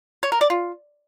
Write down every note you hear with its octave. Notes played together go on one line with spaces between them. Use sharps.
C#5
A#4
D5
F4